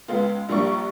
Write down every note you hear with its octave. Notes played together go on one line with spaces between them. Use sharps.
C#2 G#3 B3 F4
A#1 G3 A#3 D4 C#6